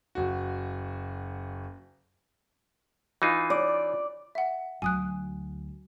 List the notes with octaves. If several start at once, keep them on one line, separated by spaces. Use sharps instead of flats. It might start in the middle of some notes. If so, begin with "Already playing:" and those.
F#1 F#4
E3 D#4 F4
D5
E5 F#5
D2 F#3 G#5 D#6 F#6